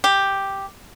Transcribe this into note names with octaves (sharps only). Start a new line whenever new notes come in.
G4